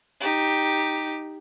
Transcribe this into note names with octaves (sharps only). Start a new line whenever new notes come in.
D#4 G4